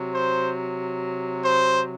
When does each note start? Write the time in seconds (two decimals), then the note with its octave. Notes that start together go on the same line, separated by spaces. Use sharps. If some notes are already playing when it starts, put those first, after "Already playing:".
Already playing: C3 F#3
0.13 C5
1.42 C5